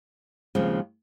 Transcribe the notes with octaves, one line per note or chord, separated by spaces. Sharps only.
D#2 C#3 F3 G#3 C4